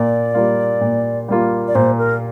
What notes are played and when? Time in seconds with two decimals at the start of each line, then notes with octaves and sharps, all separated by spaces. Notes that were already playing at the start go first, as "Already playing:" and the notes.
Already playing: A#2 A#3 D5
0.34 G3 A#3 F4
0.81 A#2
1.28 G3 A#3 F4
1.67 D5
1.75 A#2 C5
1.98 A#4